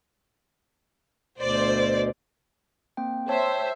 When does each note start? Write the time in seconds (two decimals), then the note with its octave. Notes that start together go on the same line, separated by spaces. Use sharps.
1.39 D2 B2 C5 D5
2.97 A#3 C4 G5
3.29 C5 C#5 E5 G5 A5